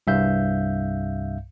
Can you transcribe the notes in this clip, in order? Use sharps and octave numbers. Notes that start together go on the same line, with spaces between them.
C2 G2 E5 F5 G6